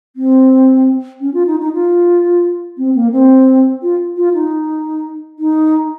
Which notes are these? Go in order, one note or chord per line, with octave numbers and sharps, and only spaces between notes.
C4
C#4
F4
D#4
D#4
F4
C4
A#3
C4
F4
F4
D#4
D#4